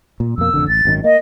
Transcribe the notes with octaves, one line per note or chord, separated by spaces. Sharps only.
A#2
F2 B2 A#3 E6
A1 F2 D3
A1 A6
G#1 F#2 D#3
A#3 D#5